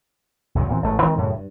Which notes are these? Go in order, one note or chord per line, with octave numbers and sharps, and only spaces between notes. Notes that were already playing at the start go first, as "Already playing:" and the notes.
C2 F#2 A#2 D#3
D2 A#2 E3 C4
A1 G#2 C3 A3
D#3 F3 G#3 C4
F#2 A2 C#3 G3
G2